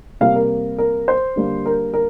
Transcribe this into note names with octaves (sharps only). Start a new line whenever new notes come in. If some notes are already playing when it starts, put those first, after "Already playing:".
C3 G3 A#3 F5
A#4
A#4
C5
D3 G3 A#3
A#4
A#4